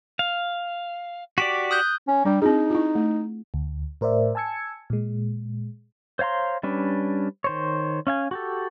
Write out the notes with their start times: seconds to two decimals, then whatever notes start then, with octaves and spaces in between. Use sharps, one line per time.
0.19 F5
1.38 F#4 G4 D5 B6
1.71 D#6 F#6 G6
2.08 C#4
2.25 G3 D4
2.42 C4 D#4 F4 G#4
2.70 E4 F4
2.95 A3
3.54 D2
4.01 A2 A#4 C5 D5 E5
4.35 G#5 A5 E6 G#6 C#7
4.90 A#2 G#3
6.19 C5 C#5 F5 A#5 C6
6.63 G3 C#4 D4 B4
7.44 D#3 C5 C#5
8.07 C#4 F5 G#5
8.31 F#4 G4 A4